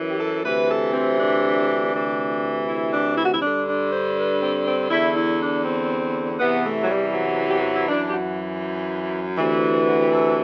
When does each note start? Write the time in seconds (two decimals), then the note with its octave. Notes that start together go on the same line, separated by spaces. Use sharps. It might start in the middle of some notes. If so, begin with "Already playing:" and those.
Already playing: F#2 E3
0.09 G4
0.19 A4
0.43 D2 C3 E3 B4
0.69 A4
0.93 C4
1.18 D4
1.93 D2 C3 E3
2.68 E4
2.92 D4
3.16 E4
3.25 F#4
3.33 E4
3.42 G2 D3 D4
3.67 D4
3.91 C5
4.16 B4
4.41 C4
4.66 C4
4.90 E2 D3 E4
5.16 E4
5.40 D4
5.65 C4
6.31 C4
6.39 E2 C3 E3 B3
6.64 A3
6.82 F#3
6.89 G3
7.13 F#3
7.48 G4
7.61 F#4
7.75 E4
7.89 F#2 E3 D4
8.09 G4
8.13 F#4
9.37 D2 C3 E3
9.88 F#4
10.00 G4
10.12 A4